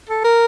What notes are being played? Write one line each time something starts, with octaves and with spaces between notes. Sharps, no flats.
A4
A#4